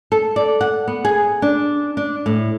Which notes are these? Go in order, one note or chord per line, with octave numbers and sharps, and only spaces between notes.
A4
D5
F#5
B3
G#4
D4
D4
A2